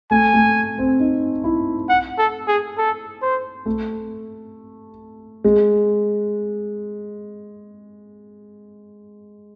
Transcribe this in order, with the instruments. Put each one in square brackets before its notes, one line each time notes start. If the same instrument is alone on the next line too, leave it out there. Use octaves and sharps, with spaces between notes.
[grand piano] A3 [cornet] G#5
[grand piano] A3
C4
D#4
E4
[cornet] F#5
A4
G#4
A4
C5
[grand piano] A3
G#3